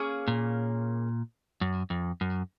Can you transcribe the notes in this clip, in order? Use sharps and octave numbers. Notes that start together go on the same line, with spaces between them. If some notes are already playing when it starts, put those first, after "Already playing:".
Already playing: A#3 C#4 G#4
A#2
F#2
F2
F#2